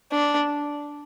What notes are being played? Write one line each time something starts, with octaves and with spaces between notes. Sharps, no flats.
D4